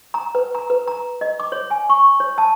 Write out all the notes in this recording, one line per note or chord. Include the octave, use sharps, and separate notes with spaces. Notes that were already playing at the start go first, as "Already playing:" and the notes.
A#5
B4
A#5
B4
A#5
D#5
D6
C#5
G#5
C#6
C#5
A5